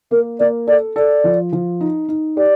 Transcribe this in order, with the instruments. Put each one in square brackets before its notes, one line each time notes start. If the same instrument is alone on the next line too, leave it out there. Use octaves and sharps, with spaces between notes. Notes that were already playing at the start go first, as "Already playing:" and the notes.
[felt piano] A#3 [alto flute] A#4
[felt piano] A#3 [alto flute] D5
[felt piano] A4 [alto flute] D5
[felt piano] A4 [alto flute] D5
[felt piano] F3
F3
D#4
D#4
[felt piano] G4 [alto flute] D5